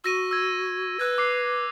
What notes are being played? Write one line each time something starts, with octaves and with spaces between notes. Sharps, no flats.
F#4 E6 A#6 D#7
E6 G#6
B4 E6 F#6 G#6
D6 C7